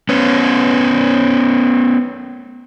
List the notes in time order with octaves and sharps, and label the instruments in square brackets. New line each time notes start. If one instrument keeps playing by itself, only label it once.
[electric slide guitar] B3 C#4